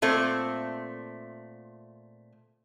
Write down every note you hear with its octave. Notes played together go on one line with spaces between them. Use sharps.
A#2 A3 C4